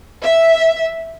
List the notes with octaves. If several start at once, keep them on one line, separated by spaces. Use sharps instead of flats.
E5